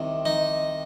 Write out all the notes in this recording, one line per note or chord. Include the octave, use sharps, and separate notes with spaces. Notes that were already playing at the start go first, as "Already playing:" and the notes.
Already playing: C2 C3 D#3
D#4